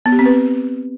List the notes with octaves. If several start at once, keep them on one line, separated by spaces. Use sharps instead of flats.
B3
G4
C4
B4